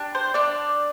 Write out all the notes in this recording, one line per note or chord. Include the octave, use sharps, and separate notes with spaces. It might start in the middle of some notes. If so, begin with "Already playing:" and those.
Already playing: D4 G4
C5
D4 D5